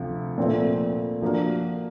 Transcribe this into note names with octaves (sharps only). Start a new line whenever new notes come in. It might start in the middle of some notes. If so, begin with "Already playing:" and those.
Already playing: D2 C3 F3
A#2 F3 A3 C4 F4
F3 A#3 D4 F#4 A#4